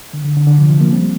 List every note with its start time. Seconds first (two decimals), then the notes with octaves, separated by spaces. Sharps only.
0.13 D3
0.25 D3
0.36 D3
0.47 D3
0.58 C3 F3
0.69 C3 F3
0.80 F3 A#3
0.93 G3 C4